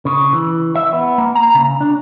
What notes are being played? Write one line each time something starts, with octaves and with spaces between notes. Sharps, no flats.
C#3
E3
E5
B3
A#3
A#5
C#3
D4